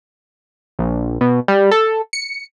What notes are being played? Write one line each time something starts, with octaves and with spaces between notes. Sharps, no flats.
A#1
B2
G3
A4
C#7